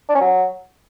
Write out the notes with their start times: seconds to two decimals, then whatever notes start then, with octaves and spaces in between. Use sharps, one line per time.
0.09 D4
0.15 C#4
0.21 F#3